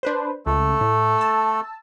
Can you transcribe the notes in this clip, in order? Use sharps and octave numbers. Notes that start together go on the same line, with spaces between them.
D4 B4 C5
C#2 A3 A4
A2
A5 E6